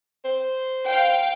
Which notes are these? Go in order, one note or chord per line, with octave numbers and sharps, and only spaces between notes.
C5
F5 G5